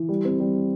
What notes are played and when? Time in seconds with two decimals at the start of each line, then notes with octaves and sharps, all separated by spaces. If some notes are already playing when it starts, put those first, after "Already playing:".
Already playing: E3
0.09 G3
0.25 C4
0.40 G3